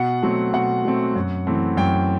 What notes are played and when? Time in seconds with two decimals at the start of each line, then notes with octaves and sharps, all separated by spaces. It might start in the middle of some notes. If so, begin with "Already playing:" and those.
Already playing: B2 F#5
0.22 F#3 A3 C4
0.53 B2 F#5
0.85 F#3 A3 C4
1.15 F#2
1.47 E3 A3 C4
1.77 F#2 G5